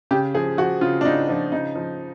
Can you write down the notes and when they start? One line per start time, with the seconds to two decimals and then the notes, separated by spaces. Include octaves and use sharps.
0.11 C#3 G4
0.34 F3 G#4
0.58 F3 F#4
0.81 C#3 F4
1.01 D4
1.05 C#3 D#4
1.29 F3 D4
1.52 C#3 D#4
1.76 F3